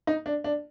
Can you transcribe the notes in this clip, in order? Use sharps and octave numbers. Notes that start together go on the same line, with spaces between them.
D#4
D4
D4